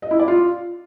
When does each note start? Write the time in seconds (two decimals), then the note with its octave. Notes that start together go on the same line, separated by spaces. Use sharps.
0.02 D#5
0.11 E4
0.19 D5
0.28 F4